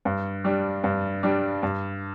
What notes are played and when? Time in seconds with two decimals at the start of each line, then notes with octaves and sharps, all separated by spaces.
0.05 G2
0.45 G3 D4
0.84 G2
1.23 G3 D4
1.63 G2